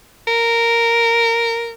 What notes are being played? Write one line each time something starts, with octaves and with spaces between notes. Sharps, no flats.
A#4